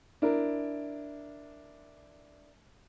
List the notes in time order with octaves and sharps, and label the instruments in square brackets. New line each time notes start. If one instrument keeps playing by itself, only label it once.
[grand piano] D4 E4 A#4